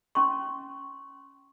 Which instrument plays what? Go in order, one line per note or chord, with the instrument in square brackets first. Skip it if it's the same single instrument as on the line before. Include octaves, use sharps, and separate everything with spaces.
[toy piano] C#4 C6 C#6